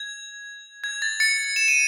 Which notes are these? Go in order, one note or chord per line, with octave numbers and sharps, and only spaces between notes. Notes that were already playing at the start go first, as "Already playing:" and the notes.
Already playing: G#6
G#6
A6
A6 C#7
E7
D#7